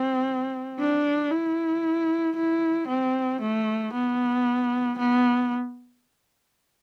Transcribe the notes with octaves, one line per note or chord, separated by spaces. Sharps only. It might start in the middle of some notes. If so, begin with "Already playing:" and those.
Already playing: C4
D4
E4
E4
C4
A3
B3
B3